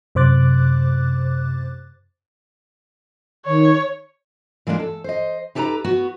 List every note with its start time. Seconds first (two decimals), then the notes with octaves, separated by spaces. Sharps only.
0.15 F#2 C3 C5 D6 F#6 A6
3.46 D#3 C#5
4.67 E3 G#3 A#3 C#4 D4
4.80 A4
5.04 C5 D#5
5.55 D#4 G4 A4 B4 A5 A#5
5.84 B3 F#4